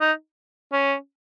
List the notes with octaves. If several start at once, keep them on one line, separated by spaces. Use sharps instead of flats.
D#4
C#4